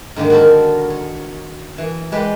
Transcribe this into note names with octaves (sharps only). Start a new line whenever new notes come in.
G#2 D3 D#3 A#3
F#4 A4 A#4
C#5
E3
G#3 B4 D5 G5